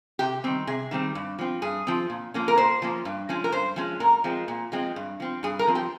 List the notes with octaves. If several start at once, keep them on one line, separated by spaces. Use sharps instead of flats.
C3 G4
D#3 G3 C4
C3 G#4
D#3 G3 C4
G2
F3 C4
G2 G#4
F3 C4
A#2
F3 A#3 C#4
A#4
A#2 C5
F3 A#3 C#4
G2
F3 G#3 C#4
A#4
G2 C5
F3 G#3 C#4
A#2 A#4
F3 G#3 C4
A#2
F3 G#3 C4
G2
F3 C4
G2 G#4
A#4
F3 C4
G4